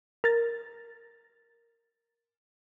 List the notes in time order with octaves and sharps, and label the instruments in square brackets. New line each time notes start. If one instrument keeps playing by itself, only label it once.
[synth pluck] A#4 A6